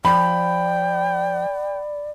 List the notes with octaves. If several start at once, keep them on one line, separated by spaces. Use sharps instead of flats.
F3 D5 G5 B5